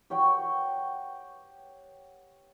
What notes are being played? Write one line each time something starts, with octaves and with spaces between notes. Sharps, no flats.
G4 C#5 F#5 G5